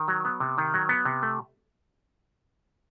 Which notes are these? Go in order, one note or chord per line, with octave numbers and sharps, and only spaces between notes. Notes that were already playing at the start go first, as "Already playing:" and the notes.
Already playing: D#3
F#3
B3
C3
D#3
F#3
B3
C3
A3